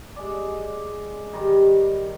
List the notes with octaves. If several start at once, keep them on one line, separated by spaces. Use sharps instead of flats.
G#3 D5
D#3 G3